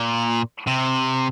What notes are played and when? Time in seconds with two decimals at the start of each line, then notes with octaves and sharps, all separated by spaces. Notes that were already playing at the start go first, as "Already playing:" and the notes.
Already playing: A#2
0.67 C3